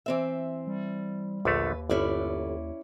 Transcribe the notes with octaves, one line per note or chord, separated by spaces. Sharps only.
E3 C4 E5
G3
A#1 D#2 D3 A3 B4
G1 C#4 E4 D5